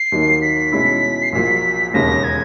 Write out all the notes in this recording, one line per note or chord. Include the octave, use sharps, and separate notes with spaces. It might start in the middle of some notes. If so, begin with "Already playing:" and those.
Already playing: C7
D#2 D#3 F#3 A#3 D#4
B6
B2 G#3 C#4 E4
C7
A#1 A#2 F#3 B6
E1 D#2 C#3 A#6
G#6